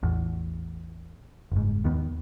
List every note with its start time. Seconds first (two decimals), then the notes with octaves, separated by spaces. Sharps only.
0.03 A1 E2
1.52 F#1 G#2
1.84 D#2 D#3 B3